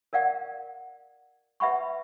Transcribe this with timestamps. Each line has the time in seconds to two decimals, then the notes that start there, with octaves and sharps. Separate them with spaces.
0.13 A#4 D5 F5 F#5
1.60 B4 E5 F#5 B5 C#6